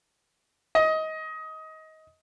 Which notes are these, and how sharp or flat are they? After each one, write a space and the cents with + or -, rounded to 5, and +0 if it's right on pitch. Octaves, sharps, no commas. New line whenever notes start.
D#5 +20